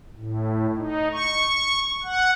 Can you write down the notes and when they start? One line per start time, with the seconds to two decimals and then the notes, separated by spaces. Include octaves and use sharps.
0.15 A2
0.77 D#4
1.12 C#6
2.03 F#5